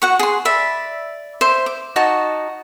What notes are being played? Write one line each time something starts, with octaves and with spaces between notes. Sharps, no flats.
F#4 F#5 C#6
G#4 C6
D5 E5 B5
C5 E5
D6
D#4 F#4 D#5 A5